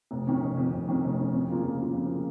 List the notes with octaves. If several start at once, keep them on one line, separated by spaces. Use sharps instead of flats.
F1
F2 D#3 C#4
F1
F2 D#3 C#4
F1
F2 D#3 C#4
F1
F2 D#3 C#4
F2
C#3 A#3 F4
F2
C#3 A#3 F4
F2
C#3 A#3 F4